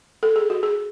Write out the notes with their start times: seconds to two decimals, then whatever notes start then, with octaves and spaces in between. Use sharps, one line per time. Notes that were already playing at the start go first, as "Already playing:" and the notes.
0.23 A4
0.36 G#4
0.50 F#4
0.63 G#4